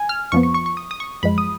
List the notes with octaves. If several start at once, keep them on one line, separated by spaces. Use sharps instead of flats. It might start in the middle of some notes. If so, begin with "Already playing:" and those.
Already playing: G#5
F6
F2 F3 B3 C#6
C#6
C#6
C#6
D#6
D#6
C#6
F#2 F3 G#3 B5
D#6